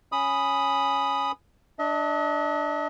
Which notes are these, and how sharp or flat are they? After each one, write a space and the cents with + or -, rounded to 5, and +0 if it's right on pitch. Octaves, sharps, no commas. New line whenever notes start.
C#4 +0 B5 +0 D#6 +0
D4 +10 D#5 +45